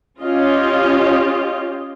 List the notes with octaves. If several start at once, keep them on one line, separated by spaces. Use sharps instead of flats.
C#4 F4 G4 D#5